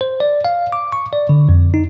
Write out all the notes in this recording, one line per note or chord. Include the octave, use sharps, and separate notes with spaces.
C5
D5
F5
D6
C#6
D5
D3
F2
D#4